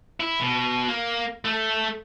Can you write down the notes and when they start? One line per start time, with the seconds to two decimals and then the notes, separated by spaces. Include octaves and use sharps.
0.20 E4
0.41 B2
0.88 A#3
1.45 A3